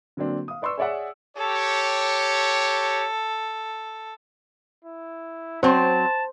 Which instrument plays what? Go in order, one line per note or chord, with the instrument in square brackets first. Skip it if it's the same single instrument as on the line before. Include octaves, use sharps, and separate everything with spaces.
[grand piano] D3 F#3 A#3 C4 D4
F5 D#6
B4 D5 C6 C#6 E6
G#4 C#5 D5 E5 F#5
[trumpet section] G4 C#5 [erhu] A4
[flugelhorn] E4
[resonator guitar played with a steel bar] F#3 C4 [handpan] C5 [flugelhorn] A5